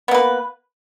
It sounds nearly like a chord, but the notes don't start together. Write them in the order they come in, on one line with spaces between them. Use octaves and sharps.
B3 A#3 B4